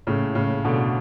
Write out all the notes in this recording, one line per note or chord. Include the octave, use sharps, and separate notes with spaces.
A2 C#3
A2 C#3
B2 D3